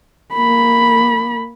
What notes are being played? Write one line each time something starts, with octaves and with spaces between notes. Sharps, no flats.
A#3 B5